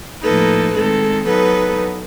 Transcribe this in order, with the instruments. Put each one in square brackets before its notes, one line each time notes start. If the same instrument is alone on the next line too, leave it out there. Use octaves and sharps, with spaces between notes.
[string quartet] A2 F3 A#3 D#4 A4 B4
D#3 G#3 C4 A4
F#3 B3 D#4 A4 B4